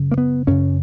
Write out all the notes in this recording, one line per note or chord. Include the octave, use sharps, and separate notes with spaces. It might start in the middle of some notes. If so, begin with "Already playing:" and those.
Already playing: F#2 C#3
A#3
B3
F#2 C#3 C#4